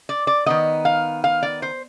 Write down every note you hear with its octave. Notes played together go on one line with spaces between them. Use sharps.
D5
D5
D#3 B3 D#5
F5
F5
D5
C5